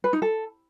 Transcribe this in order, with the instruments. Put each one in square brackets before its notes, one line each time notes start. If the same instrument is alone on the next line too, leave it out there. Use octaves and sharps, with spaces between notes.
[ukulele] B4
D#4
A4